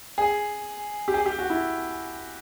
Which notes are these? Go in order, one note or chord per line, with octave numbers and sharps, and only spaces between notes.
G#4
G4
G#4
G4
F#4
E4